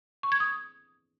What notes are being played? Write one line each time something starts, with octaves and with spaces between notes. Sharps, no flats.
C#6
G#6
D#6